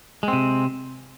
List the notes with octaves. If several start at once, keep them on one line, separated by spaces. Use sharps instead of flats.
C3 G#3 C4